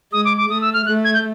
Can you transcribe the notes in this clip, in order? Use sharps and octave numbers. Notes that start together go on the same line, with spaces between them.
G#3 D#6
D6
D6
A3 D#6
E6
F6
A3 F#6
G#6
G6